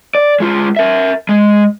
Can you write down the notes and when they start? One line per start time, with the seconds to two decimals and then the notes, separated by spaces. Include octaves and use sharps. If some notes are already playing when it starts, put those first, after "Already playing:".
0.15 D5
0.40 G#3 F4
0.76 A#4 E5
1.29 G#3